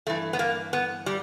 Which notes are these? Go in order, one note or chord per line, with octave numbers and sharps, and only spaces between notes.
G2 E3 A3
B3
A#3
B3
G3